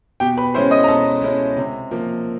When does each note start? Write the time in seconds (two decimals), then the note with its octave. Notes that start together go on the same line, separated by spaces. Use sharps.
0.20 B2 G4 G5
0.37 B4 B5
0.54 G#3 C#4 E4 C5 C6
0.71 D#5 D#6
0.84 A#5
0.88 B2 A4 A5
1.22 G#3 C#4 E4
1.57 C3
1.91 F3 A#3